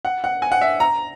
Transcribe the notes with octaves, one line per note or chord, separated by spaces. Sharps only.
F#5
F#5
G#5
F#5
E5
A#5